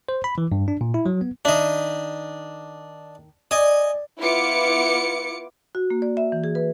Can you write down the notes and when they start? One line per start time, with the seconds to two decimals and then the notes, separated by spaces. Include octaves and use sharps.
0.09 C5
0.24 B5
0.38 E3
0.52 G2
0.68 D4
0.81 A#2
0.94 E4
1.06 F#3
1.21 B3
1.45 D#3 D4 D#5 E5
3.51 D5 D#5 G#5 D#6
4.20 B3 E4 F4 D6 C#7
5.75 F#4
5.90 A#3
6.02 D5
6.17 E5
6.32 E3
6.44 G#4
6.55 B4